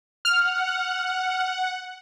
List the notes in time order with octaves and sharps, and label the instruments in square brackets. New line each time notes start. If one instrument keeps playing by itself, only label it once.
[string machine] F#5 [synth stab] F6